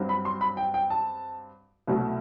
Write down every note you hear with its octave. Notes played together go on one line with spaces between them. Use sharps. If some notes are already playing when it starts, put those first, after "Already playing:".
Already playing: G2 F#3 C4
B5
C6
B5
G5
G5
A5
C2 B2 F#3 A3